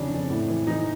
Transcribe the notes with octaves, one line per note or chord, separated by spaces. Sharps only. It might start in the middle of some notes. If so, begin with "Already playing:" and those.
Already playing: F2 C#3 E3 D4
F2
A2
E3
E3 D#4